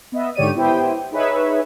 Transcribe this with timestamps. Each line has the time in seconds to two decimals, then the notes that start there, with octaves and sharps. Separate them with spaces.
0.12 B3 D#5 E5
0.35 G#2 D3 G4 C#5 D5 D#7
0.55 B3 E4 G4 C5 G5
1.11 D#4 G#4 B4 C#5 E5